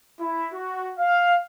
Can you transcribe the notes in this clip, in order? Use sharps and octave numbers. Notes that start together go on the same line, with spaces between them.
E4
F#4
F5